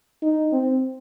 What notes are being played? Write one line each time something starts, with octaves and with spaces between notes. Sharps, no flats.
D#4
C4